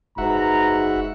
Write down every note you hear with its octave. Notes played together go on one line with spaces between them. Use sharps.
F#1 G#2 F#4 B4 E5 F#5 A#5